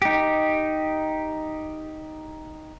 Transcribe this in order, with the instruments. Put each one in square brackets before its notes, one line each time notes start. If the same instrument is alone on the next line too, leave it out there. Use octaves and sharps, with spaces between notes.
[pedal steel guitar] D#4 G4